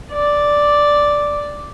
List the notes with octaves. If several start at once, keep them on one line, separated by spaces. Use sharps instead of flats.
D5